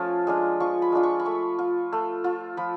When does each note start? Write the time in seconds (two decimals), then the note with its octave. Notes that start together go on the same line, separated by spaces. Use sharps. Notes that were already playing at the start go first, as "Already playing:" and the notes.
Already playing: F3 A3 C#4 F4
0.27 G#3 D4 F4
0.60 F3 C#6
0.82 B5
0.92 G#3 D4 F4
1.03 C#6
1.20 B5
1.25 A3 C#6
1.59 F4
1.92 A3
2.24 F4
2.57 F3 B5